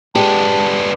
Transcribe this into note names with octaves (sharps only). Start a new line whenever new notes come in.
G#3 B3 D4 G4 A5